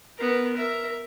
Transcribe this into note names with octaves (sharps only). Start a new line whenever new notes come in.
B3 A#4
A#4 E5